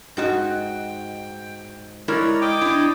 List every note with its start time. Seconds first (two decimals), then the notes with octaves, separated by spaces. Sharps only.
0.17 G#2 F#4 D#5 G5
2.08 G#3 E4 A#4 C#5 D5 A#5
2.41 D#5 G5 D6
2.61 D4 E4